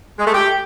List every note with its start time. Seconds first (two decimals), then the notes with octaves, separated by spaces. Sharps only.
0.19 G#3
0.26 A3
0.34 G4